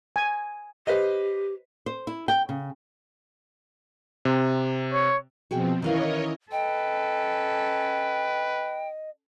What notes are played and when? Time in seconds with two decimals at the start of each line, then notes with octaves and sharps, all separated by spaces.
0.16 G#5
0.87 G4 B4 C5 D#5
1.86 C5
2.07 E4
2.28 G5
2.49 C#3
4.25 C3
4.93 C#5
5.51 B2 F3 C4 F#4 G#4 G5
5.82 D#3 E3 C#4 A#4 C#5 D#5 F5
6.52 C#4 A4 B4 D#5 G5